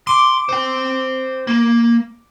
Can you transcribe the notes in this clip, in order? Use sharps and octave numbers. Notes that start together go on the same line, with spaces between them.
C6 D6
C5 G5
A#3